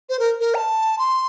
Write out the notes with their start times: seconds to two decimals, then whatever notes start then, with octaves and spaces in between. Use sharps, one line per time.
0.09 C5
0.19 A#4
0.40 A#4
0.54 A#5
0.58 A5
0.99 C6